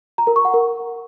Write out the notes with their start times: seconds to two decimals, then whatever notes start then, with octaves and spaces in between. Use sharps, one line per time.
0.18 A#5
0.27 A#4
0.36 C#6
0.45 F#5
0.54 A#4